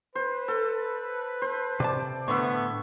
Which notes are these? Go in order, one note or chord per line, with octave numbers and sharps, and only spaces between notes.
B4 C5
A4
C5
C3 D5 A5 D6
A2 D3 B3 E5 C6 C#6